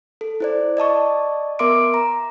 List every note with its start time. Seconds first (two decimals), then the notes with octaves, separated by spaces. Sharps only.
0.21 A4
0.40 E4 C5 D5
0.77 D5 D#5 A5 C#6
1.59 B3 A#4 E5 C6 D6 D7
1.94 A#5